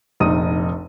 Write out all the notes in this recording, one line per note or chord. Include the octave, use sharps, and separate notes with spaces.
F1 A#1 D#4 D#6 D#7